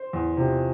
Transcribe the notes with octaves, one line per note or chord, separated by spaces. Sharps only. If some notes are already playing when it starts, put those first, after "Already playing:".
Already playing: C5
E2
C3 F3